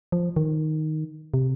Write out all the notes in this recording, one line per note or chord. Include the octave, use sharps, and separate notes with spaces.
F3
D#3
C3